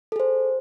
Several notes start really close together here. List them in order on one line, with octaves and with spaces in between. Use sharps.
A4 G#4 C5